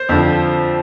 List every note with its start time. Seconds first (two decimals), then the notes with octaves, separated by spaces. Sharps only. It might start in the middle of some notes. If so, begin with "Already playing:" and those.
Already playing: C5
0.09 F2 D3 F3